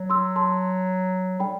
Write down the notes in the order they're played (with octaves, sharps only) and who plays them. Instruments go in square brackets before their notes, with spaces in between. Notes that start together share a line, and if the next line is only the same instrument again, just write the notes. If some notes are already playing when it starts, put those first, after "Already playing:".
Already playing: [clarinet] F#3
[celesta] C6 E6
A5 C6
[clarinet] G3 [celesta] G5 B5